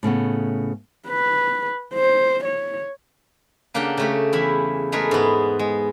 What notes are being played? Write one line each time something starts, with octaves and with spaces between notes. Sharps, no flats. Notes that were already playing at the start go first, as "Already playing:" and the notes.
A2 C#3 A3 B3
B4
C5
C#5
C#3 A#3 D4 G4 F#5 G5
C#3 A3 G4
E2 E4 E5 B5
G#3 A3 G#4 A#4 B4
G#2 B3
G#3